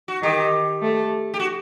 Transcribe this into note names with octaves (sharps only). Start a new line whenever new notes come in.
F#4
D#3 G4
A3
G4
F#4